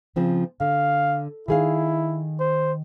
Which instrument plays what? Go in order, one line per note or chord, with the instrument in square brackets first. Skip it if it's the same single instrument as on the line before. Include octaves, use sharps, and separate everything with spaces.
[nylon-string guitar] C#3 F3 C4
[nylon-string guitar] D3 [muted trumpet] F5
[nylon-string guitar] D#3 G#4 F5 [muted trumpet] E4
[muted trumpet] C5